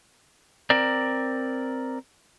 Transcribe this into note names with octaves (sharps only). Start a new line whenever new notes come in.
C4 A#4 D5